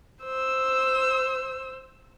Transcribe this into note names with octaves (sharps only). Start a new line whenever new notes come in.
C5 E6